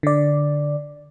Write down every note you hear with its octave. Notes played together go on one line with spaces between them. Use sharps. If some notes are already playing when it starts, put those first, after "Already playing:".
D3 D5